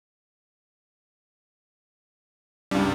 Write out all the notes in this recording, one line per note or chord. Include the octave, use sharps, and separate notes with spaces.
C#2 G2 G3